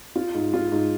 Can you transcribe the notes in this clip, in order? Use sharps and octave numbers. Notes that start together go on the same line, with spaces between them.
F4
G#2
F4
G#2